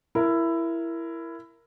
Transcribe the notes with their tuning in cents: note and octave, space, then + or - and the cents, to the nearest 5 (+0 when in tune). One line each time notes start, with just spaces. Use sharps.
E4 +15 A#4 +0